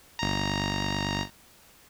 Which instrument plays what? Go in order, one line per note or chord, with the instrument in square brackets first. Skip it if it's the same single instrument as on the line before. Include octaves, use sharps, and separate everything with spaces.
[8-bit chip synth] G1 A#5